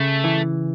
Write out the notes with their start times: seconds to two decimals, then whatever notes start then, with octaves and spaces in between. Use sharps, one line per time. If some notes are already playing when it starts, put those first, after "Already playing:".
Already playing: C#3 A3
0.24 E3